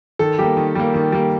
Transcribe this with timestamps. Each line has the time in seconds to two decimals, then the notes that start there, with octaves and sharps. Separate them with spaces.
0.19 D#3 A4
0.38 G3 A#3 G4
0.57 D#3
0.75 G3 A#3
0.94 D#3
1.12 G3 A#3